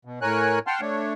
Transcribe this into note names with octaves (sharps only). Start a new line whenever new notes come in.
B2
A2 A#4 C#5 G#5 F#6
F#5 G5 A5 C6 F6
A3 D4 C#5